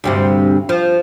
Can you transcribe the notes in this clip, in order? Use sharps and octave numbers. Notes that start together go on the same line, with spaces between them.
D2 G2 C3
F3